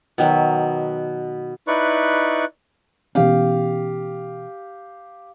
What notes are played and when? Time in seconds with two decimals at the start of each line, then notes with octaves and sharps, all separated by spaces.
0.18 B2 D#3 F#3
1.68 D#4 E4 B4 D5 C#6 F#6
3.15 B2 E3 C#4 G4 F5